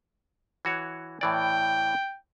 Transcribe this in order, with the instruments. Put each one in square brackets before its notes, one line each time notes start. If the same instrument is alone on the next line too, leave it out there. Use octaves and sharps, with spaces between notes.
[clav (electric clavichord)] E3 F#4 C#5
[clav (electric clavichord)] A2 E3 D5 [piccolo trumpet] G5